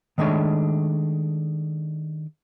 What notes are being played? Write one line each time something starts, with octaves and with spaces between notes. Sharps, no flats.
D#3 G#3 A3 D4 C#5